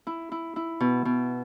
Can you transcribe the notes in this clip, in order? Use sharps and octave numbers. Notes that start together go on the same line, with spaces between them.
E4
E4
E4
B2
B2